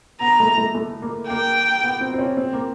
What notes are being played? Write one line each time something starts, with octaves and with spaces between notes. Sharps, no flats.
B3 A#5
A3
A3
A3
A#3
A#3 G5
B3
C4
C4
C#4
C4
A#3